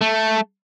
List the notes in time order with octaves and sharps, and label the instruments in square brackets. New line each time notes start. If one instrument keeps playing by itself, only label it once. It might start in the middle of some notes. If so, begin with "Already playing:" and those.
[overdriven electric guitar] A3